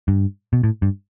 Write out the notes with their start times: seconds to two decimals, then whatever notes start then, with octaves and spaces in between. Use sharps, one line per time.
0.08 G2
0.53 B2
0.63 A2
0.82 G2